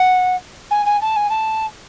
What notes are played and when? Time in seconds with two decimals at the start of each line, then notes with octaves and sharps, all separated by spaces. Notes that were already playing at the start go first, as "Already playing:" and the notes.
Already playing: F#5
0.71 G#5
0.86 G#5
1.02 A5
1.16 G#5
1.30 A5